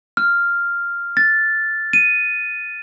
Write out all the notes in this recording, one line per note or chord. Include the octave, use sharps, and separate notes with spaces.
F6
A6
D#7